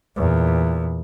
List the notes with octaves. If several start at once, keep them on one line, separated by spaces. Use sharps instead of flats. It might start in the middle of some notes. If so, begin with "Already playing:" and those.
E2 A#2